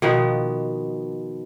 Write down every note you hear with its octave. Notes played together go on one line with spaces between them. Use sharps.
B2 D#3 F3 B3